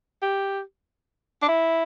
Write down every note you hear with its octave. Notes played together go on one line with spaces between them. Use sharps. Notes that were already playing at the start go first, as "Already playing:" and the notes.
G4
D4
E4